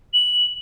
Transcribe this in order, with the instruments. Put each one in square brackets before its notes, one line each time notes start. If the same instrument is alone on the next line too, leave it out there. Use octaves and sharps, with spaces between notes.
[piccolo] F#7